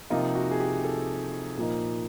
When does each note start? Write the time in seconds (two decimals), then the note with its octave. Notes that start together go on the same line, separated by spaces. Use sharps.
0.10 C3 F3 A#3 D#4 F4
0.35 F#4
0.51 G#4
0.60 G4
0.84 A4
1.57 A#2 F3 A#3 D#4